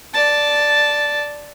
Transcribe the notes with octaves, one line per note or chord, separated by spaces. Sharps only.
D5 A5